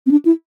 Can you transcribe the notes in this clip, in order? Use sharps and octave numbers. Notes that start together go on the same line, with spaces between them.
C4
D4
E4